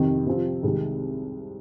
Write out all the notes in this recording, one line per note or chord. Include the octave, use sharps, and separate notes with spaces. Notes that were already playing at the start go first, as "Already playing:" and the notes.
Already playing: F2 C3 D#3
C3 F3 C4 F4
C2 C3 D#3 G#3